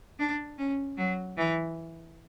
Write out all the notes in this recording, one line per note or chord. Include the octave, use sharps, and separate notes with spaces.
D4
C#4
F#3
E3